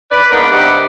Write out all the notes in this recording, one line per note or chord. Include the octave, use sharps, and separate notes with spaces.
B4 D5
G#2 A#3 B3 D4 D#4 A#4
G2 C3 G3 D5 D#5 F#5